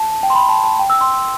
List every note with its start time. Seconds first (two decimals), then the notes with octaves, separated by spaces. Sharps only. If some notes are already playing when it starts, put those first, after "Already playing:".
Already playing: A5
0.12 A5
0.23 G5
0.30 C6
0.35 B5
0.49 A5
0.64 A5
0.79 G5
0.90 E6
1.01 C6